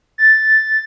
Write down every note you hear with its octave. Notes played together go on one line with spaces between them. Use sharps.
A6